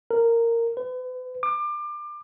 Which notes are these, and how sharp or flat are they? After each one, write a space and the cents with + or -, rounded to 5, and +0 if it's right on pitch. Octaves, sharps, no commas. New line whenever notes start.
A#4 -10
B4 +40
D6 +30